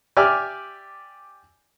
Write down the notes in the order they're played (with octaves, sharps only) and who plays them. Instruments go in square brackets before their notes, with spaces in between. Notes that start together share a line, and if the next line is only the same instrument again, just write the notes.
[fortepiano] G4 D5 E5 G#5 F6